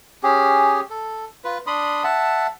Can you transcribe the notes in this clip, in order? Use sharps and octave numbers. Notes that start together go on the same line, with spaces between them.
C#4 G4 G#4
A4
F4 B4
D4 B5 C6 D#6
E5 F#5 A5